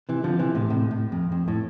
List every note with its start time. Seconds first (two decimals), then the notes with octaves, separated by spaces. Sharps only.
0.09 C3 E3
0.24 D3 F3
0.39 C3 E3
0.55 A2 C3
0.70 A2 C3
0.91 A2
1.12 F2
1.32 F2
1.48 A2